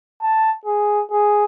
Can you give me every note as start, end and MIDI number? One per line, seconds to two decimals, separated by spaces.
0.22 0.52 81
0.65 1.03 68
1.11 1.44 68